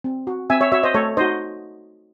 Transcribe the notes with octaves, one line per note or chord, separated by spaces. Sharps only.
C4
F#4
C4 E5 G#5
C#5 E5
F#4 C#5 E5
C5 D#5
A3 A4 C#5
D#4 F#4 C5 D#5